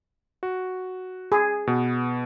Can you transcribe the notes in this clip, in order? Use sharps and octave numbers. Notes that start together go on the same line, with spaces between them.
F#4
G#4
B2 B3